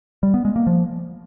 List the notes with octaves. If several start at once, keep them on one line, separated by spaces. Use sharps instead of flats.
G3
B3
G#3
A#3
F3